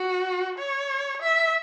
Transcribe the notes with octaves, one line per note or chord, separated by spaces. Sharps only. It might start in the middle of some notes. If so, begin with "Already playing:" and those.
Already playing: F#4
C#5
E5